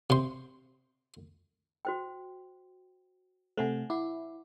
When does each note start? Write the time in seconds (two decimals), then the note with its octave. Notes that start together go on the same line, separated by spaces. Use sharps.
0.10 C3 C6
1.85 F#4 C5 G5
3.57 C3 A3 C5 F#5 G#5
3.90 E4 F#5 D6